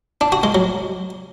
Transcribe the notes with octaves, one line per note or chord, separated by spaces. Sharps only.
D4
F#4
G#3
F#3